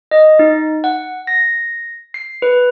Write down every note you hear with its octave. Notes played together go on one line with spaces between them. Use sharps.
D#5
D#4
F#5
A#6
C7
B4